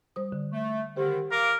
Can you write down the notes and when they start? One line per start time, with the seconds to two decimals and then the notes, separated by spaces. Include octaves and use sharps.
0.16 G3 C5 D#6
0.32 D3
0.53 A3
0.97 D3 D#3 G4 C5
1.32 A#4 F5 D6